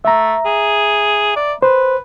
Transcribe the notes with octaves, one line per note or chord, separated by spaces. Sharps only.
A3 E5 A#5
G#4
D5
B4 C5